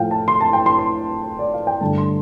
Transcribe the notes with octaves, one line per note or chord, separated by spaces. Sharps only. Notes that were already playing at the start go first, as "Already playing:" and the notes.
Already playing: A2 F3 A3 F5 G5
A5
C6
A5
G5
C6
C6
D5
F5
G5
G2 D3 A3 D4 A5
C6